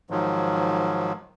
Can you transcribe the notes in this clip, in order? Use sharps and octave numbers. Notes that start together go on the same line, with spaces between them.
G#2 D#3 F3 F#3